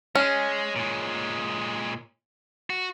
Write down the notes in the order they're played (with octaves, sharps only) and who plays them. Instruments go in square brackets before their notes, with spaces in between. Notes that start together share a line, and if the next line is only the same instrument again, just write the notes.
[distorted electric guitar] G#3 [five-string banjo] C#4
[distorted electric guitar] A#2 G#3
F#4